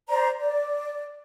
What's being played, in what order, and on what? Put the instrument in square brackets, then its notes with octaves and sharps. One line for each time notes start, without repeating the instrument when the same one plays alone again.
[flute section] C5 D5 A#5
D5